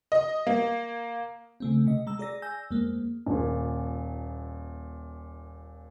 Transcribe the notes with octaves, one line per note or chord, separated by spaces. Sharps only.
D#5
A#3
C#3 A3 C4
C3 D#5
G#3 A#5 E6
G#4 D5 A#6
G#5 E6 G6 A#6
F2 G#3 A#3
D#1 A#2